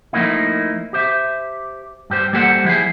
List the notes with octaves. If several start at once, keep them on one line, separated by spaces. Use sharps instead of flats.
F3 A3 A#3 D#4 E4
G4 C5 E5
G2 G4 C5
G3 A#3 G4 A4 C5 F#5
F3 E4 G4 G#4